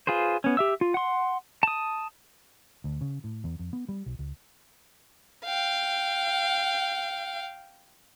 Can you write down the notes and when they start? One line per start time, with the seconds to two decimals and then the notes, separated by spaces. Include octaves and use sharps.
0.07 F4 G#4 B4 C5
0.44 B3 C#4
0.57 G4 E5 E6
0.81 F4
0.94 F#5 C6
1.63 A5 D#6
2.84 D2
3.01 C#3
3.24 A2
3.44 E2
3.59 F2
3.73 B3
3.89 G3
4.06 B1
4.19 C#2
5.45 F5 G5